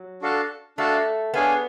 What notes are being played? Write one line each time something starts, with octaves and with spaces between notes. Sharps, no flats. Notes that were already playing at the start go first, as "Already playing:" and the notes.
Already playing: F#3
D4 F#4 A4 F5 A5
A3 D4 F#4 A4 F5 A5
B3 D4 G#4 C#5 F5 G#5